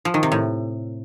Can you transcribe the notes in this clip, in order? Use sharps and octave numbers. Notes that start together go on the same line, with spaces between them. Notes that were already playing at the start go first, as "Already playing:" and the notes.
F3
D#3
C3
A2